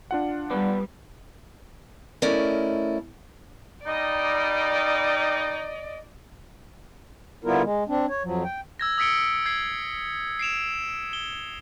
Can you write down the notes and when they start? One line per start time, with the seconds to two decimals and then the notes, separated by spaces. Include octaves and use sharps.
0.11 D4 F4 F#5
0.50 G3 B3 B4 D5
2.22 A3 C#4 E4 A#4 D5 D#5
3.86 G3 A#3 D#4 D5 D#5
7.45 D3 G3 B3 E4 F4 A#4
7.63 G#3
7.88 C4 D4
8.09 C#5
8.23 F2 F3 F#3
8.44 G5
8.79 E6 G#6 A#6
8.98 D#6 E6 B6 C#7 D7 G7
9.46 G#6 C7
10.39 C7 D7 E7 F7
11.13 G7